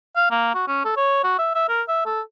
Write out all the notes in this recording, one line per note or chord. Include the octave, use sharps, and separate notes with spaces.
F5
A#3
F#4
C#4
A4
C#5
F#4
E5
E5
A#4
E5
A4